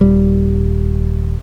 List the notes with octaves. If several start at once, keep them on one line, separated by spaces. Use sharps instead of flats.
D#1 G3